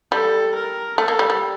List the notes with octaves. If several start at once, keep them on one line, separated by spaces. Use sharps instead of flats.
G3 A4
A#4
A3 A4
A#3
G3
G3